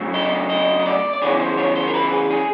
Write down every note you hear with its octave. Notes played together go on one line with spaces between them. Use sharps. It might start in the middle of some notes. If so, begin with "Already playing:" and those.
Already playing: C#3 F#3 A3
D#5
D#5
D#5
D5
D5
C#3 E3 G#3 C#5
C5
C#5
C5
A#4
B4
G#4
G#4